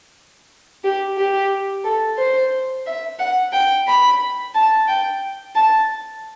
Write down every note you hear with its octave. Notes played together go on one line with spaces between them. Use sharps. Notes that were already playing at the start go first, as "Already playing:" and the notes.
G4
G4
A4
C5
E5
F#5
G5
B5
A5
G5
A5